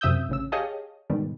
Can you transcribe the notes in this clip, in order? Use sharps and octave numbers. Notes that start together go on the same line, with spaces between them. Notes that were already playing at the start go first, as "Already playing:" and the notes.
F#2 C3 E5 D#6 E6 G6
A1 C#3 E6
G4 G#4 C#5 D#5 F5 A5
G#2 B2 D#3 G3